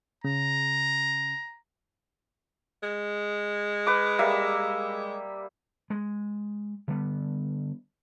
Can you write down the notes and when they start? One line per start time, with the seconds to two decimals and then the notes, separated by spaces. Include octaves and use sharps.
0.24 C#3 A#5
2.83 G#3
3.87 B4 D6
4.19 G3 A#3 E5
5.90 G#3
6.88 D3 G3 B3